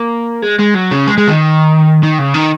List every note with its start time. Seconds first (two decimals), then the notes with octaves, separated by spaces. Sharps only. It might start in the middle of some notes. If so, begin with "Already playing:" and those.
Already playing: A#3
0.43 G#3
0.59 G#3
0.75 F#3
0.91 C#3
1.07 G#3
1.18 G#3
1.28 D#3
2.03 D#3
2.19 C#3
2.34 D#3